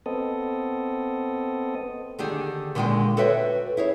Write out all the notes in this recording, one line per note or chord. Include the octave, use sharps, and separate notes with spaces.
B3 C4 A4 D#5
D3 D#3 D4 G4 G#4
A#2 D3 D#3 G#3 D4 G5
F#4 A4 B4 C#5 E5 G5
E4 G#4 C#5